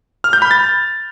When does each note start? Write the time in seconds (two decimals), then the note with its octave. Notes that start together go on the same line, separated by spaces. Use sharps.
0.24 F6
0.33 G6
0.42 B5
0.51 A6